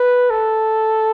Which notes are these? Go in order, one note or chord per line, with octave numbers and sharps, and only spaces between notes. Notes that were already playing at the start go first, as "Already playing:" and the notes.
Already playing: B4
A4